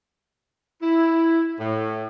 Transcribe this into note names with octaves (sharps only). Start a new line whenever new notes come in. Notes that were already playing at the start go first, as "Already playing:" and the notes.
E4
A2